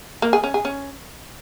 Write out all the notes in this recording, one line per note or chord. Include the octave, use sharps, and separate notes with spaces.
A#3
G#4
C#4
G#4
C#4